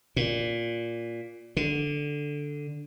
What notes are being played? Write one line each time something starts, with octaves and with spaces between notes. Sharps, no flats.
A#2
D3